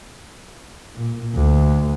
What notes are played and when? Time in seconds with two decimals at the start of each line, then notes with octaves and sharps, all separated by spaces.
0.96 A#2
1.35 D2